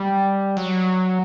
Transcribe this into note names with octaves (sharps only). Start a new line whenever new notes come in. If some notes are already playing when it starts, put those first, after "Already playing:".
Already playing: G3
F#3